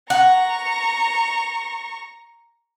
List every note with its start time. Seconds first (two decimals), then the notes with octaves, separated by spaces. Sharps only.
0.10 F#5 A#5 C#6